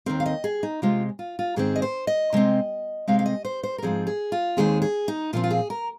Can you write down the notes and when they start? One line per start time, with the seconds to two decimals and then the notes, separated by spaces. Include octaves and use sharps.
0.06 D#2 D#3 C4 A#4
0.20 F5
0.26 D#5
0.44 G#4
0.63 D#4
0.82 C3 G#3 C4 F4
1.19 F4
1.39 F4
1.56 G#2 D#3 C4 G#4
1.76 D#5
1.82 C5
2.07 D#5
2.33 C3 G#3 C4
3.07 C3 G#3 C4 F5
3.19 F5
3.26 D#5
3.45 C5
3.63 C5
3.78 A#4
3.82 G#2 F3 C4 G#4
4.07 G#4
4.32 F4
4.57 D#2 D#3 G#3 C4 G#4
4.82 G#4
5.08 D#4
5.33 A#2 F3 C4 F4
5.44 F4
5.51 G#4
5.70 A#4